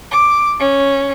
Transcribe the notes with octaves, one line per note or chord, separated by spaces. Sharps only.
D6
C#4